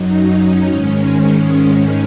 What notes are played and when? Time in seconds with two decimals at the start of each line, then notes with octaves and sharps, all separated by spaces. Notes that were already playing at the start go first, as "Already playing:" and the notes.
Already playing: F#2 F#3 D#4
0.25 C#4
0.67 G#2 D#3 G#3 C#4